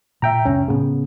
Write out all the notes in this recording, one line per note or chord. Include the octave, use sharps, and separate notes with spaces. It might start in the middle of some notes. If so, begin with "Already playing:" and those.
A#2 E5 G5 A#5
C#2 F#2 C#3 C#4
A2 C#3 F#3 B3